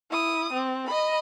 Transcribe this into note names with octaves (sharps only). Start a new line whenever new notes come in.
E4 D#6
C4
D#5 B5